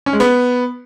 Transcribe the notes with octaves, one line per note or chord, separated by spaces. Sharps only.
C#4
G#3
B3